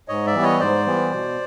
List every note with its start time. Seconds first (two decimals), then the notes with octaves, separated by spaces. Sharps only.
0.08 G#2 C#5 D#5
0.26 D5 E5
0.34 E3 G3 B3
0.43 C#5 D#5
0.60 G#2 C5 D5
0.86 E3 G3 B3
1.12 B2